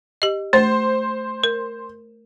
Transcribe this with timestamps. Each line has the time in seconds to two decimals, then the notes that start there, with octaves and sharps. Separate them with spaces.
0.22 G4 D#5
0.53 A3 C5
1.44 A#4